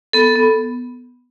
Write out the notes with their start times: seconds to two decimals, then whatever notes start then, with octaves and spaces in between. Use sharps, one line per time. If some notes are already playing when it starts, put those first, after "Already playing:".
0.13 B3 A4
0.36 B3